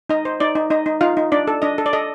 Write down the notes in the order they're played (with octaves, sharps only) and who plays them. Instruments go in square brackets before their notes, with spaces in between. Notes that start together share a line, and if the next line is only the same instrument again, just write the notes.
[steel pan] D#4 D#5
C5
D#4 D5
D#4
D#4 D#5
D#4
D#4 F4 F5
D#4
D4 D5
A4
D4 D#5
A4
D5
A4 D#5